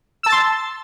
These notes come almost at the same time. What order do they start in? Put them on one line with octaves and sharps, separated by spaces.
E6 A5 A6 C6